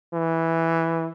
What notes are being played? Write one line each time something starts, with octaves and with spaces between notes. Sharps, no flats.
E3